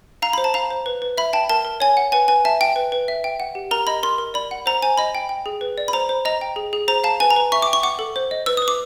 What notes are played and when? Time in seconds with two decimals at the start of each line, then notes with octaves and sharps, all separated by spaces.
0.22 F5 A#5
0.33 B5
0.38 C5
0.44 A5
0.54 F5 A#5
0.70 C5
0.86 B4
1.02 B4
1.18 E5 B5
1.33 G5 A5
1.49 A#4 A5
1.65 A#4
1.80 C#5 G#5
1.97 F#5
2.12 B4 G#5
2.28 B4 G#5
2.45 E5 A5
2.61 G5
2.76 B4
2.92 B4
3.08 E5
3.24 G5
3.40 F#5
3.55 G4
3.71 A#4 A#5
3.87 D#5 B5
4.03 A#4 C6
4.18 A#4
4.34 D5 B5
4.51 F#5
4.66 C5 A#5
4.82 C5 G#5
4.98 D#5 B5
5.15 G5
5.29 G5
5.46 G#4
5.61 B4
5.78 D5
5.88 B5
5.93 C5 A#5
6.09 C5
6.25 D#5 A#5
6.41 G5
6.56 G#4
6.73 G#4
6.88 C5 A#5
7.04 F5 A5
7.20 B4 G#5
7.30 A#5
7.36 B4
7.52 E5 C#6
7.62 D6
7.67 G5
7.73 C#6
7.83 F#5 D6
7.99 A4
8.16 C5
8.31 D#5
8.46 B4 E6
8.57 D#6
8.62 B4
8.68 D6